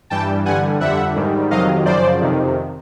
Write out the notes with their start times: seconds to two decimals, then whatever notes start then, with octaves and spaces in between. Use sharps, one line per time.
0.10 G2 E3 G3 G5 A5
0.45 G2 D3 G3 F#5 G#5
0.80 F2 D3 G3 E5 F#5
1.16 G#2 D#3 G3
1.50 F2 C3 D#3 F#3 D#5 F5
1.85 F#2 C#3 F3 C5 D5
2.21 F2 C3 D#3